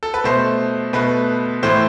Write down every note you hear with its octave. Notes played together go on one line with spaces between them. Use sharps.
A4
B4
B2 A3 C5
B2 A3 B4
A2 E3 A3 C5